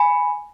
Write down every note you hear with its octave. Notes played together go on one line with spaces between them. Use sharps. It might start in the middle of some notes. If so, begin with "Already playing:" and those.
Already playing: G#5 B5